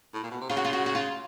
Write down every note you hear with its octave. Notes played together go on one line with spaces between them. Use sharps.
A2
A#2
B2
C3
C#3 F4
F#4
F4
F#4
F#4
F4